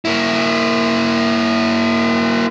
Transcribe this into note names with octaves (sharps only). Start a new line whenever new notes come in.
A#3 E4